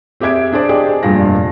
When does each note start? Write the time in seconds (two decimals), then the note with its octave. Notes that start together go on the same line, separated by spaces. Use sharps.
0.20 C4 G4 G#4 E5 G#6 D7
0.53 D4 G#4 C5 D5
0.69 G4 G#4 D5 D#5 G5 D6
1.03 F1 G2 A#2 F4 A#6